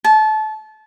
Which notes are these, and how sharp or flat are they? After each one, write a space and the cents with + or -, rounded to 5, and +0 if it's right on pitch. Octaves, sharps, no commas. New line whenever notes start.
A5 -25